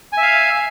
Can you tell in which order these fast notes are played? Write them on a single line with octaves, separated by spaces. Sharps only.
G#5 E5 F5